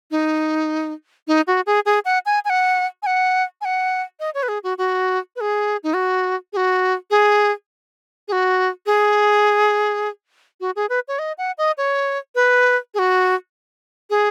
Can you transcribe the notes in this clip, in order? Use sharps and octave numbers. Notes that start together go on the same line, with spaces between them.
D#4
D#4
F#4
G#4
G#4
F#5
G#5
G#5
F#5
G#5
F#5
G#5
F#5
D#5
C#5
B4
G#4
F#4
F#4
B4
G#4
D#4
F#4
G#4
F#4
G#4
G#4
F#4
G#4
F#4
G#4
B4
C#5
D#5
F#5
D#5
C#5
B4
G#4
F#4
G#4